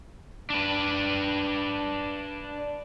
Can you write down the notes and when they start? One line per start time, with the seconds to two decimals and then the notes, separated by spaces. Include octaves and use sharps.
0.50 D4 B4